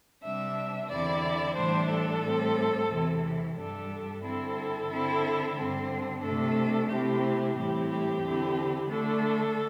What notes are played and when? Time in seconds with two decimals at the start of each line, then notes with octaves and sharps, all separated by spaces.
0.23 C3 G3 D4 E5
0.90 E2 D3 C4 E4 D5
1.57 A2 E3 G3 D4 C5
1.89 A4
2.23 A2 G3 C4
2.90 E2 C3 E3
3.57 G2 G3 D4 A4
4.23 G2 D3 C4 E4 A4
4.90 D3 C4 E4
5.57 G2 D3 C4
6.23 C3 A3 D4 A4
6.90 C3 A3 C4 E4 G4
7.56 A2 E3 G3 C4 E4 G4
7.90 G4
8.22 E2 D3 C4 E4
8.89 D3 A3 D4 A4